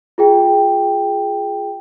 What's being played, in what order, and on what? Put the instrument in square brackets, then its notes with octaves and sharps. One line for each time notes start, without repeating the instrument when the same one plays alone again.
[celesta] F4 G#4 G5